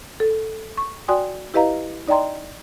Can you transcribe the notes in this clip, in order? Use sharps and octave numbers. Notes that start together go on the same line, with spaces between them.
A4
C#6
F#4 D5 G5 G#5 C6 D#6
E4 G4 B4 D#5 F5 A#5
D#4 D5 D#5 G5 A#5 C6